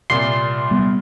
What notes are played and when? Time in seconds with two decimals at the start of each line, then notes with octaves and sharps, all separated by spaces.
0.10 C2 A#2 C6
0.71 G3 B3